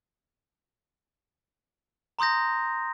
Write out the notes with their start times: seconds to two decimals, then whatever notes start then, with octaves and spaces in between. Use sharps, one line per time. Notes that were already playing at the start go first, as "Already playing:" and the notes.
2.19 A#5 C6 D#6 G6 A#6